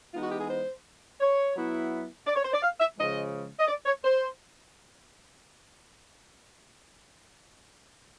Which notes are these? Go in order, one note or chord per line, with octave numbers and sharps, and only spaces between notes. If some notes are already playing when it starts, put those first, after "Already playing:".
E3 G#3 B3 D#4 F4
F#4
G4
G#4
C5
C#5
F#3 B3 E4
D5
C#5
C5
D5
F5
E5
C#3 F3 G#3 D#5
D#5
D5
C#5
C5